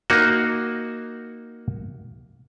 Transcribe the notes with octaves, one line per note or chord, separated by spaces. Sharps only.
A#3 D#4 F#4